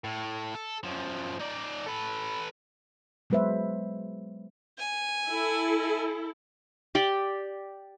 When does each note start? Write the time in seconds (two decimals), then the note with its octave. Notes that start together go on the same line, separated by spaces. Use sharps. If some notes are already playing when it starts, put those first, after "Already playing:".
0.04 A2
0.55 A4
0.83 F#2 F3
1.39 D#4 D5
1.86 A4 B4
3.30 F#3 G#3 B3 B4 C5 E5
4.79 G#5
5.28 E4 A4
6.95 G4 D5 G5